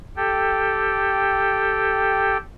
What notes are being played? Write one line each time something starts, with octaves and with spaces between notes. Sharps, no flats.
G4 A4 G5